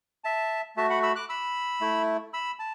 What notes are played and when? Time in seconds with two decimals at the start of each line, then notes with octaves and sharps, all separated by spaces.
0.24 E5 A5
0.76 A3 F#4 E5 A5
0.90 F#5 B5
1.03 B5 E6
1.15 D6 F#6
1.29 B5 E6
1.81 A3 E4
2.33 B5 E6
2.59 A5